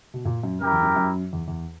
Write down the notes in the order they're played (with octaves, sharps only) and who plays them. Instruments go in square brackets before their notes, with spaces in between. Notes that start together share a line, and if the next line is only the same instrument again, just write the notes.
[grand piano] B2
A#2
F#2
[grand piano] F#2 [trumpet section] E4 G4 A#4
[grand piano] E2
F#2
F#2
E2
E2